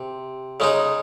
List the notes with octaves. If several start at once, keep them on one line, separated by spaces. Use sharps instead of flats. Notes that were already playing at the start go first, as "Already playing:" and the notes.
Already playing: C3
C#3 G#3 D#4